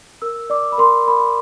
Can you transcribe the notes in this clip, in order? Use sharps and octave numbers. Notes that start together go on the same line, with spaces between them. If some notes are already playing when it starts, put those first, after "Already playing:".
A#4 E6
D5 D6
B5
A#4 C6
A#4 B5